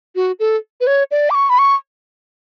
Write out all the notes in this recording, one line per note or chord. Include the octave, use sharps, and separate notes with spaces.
F#4
A4
B4
C#5
D5
D6
C#6
B5
C#6